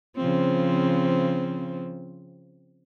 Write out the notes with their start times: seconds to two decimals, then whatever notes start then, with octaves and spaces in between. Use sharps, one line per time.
0.16 C#3 F3 C4